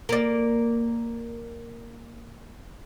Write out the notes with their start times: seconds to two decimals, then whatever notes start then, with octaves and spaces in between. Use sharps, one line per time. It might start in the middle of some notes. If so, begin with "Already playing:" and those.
0.09 A#3 D5